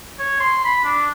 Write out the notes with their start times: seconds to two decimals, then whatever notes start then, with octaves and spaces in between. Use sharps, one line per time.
0.19 C#5
0.40 C6
0.65 B5
0.85 D4